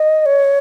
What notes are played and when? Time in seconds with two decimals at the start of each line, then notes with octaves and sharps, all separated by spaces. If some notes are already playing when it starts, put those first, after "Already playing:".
Already playing: D#5
0.26 C#5